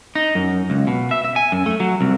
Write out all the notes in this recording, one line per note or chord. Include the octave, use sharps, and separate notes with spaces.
D#4
F#2
C#2
B2
E5
E5
G#5
F#2
A3
F#3
C2